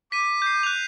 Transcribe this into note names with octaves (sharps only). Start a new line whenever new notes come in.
D6 B6 D#7
G6 C7
F#6 F7